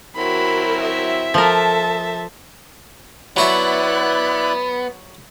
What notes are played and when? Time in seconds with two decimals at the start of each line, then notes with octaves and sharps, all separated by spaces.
0.16 F#3 C4 E4 F#4 A#4 B5
0.81 E5
1.34 F3 A4 A#4 A5
3.36 F#3 B3 E4 F#4 D5 E5 F#6